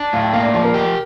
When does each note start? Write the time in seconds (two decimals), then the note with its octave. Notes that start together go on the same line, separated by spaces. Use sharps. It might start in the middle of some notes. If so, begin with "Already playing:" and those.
Already playing: D4
0.13 A2 F5
0.23 G5
0.33 A#3 F5
0.43 D5
0.53 F3 D5
0.64 A#4
0.74 G4